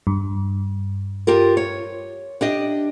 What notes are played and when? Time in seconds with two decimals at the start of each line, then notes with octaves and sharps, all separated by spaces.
0.07 G2
1.27 F4 G4 A#4
1.57 C#5
2.41 D4 G4 D#5